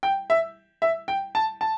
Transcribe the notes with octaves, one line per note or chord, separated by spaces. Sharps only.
G5
E5
E5
G5
A5
A5